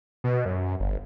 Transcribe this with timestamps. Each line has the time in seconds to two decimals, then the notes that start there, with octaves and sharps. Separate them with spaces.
0.24 B2
0.46 F#2
0.80 G1